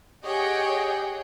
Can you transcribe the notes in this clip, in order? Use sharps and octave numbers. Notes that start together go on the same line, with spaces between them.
G4 G#4 C#5 D#5 F#5 G5